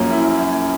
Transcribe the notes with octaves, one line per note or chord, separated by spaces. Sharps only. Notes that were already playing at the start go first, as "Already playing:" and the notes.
Already playing: F#2 F3 A#3 C#4
E4